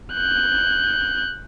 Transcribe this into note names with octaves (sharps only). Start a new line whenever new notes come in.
F#6 G6